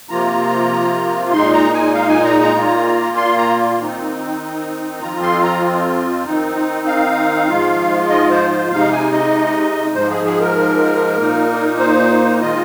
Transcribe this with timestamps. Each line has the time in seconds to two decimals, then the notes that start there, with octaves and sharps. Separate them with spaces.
0.10 C3 F3 A#3 F4 A#5
1.33 A#2 G#3 D#4 C6
1.53 A#5
1.74 G#5
1.94 F5
2.09 G#5
2.25 A#5
2.41 A#5
2.56 A#2 A#3 F4
3.17 C6
3.38 A#5
3.79 D#3 C4 D#4
5.01 F2 F3 C4 F4 A#5
5.22 C6
5.43 A#5
6.25 D#3 C4 D#4
6.87 F5
7.48 G#2 F3 G#3 F4
8.10 D#5
8.31 C5
8.51 C5
8.72 C3 G#3 D#4 F5
8.92 G#5
9.13 D#5
9.94 G#2 F3 G#3 C5
10.10 G#4
10.25 G#4
10.41 A#4
11.18 A#2 A#3 D#4
11.80 C5
12.41 D#3 G#3 F4 D#5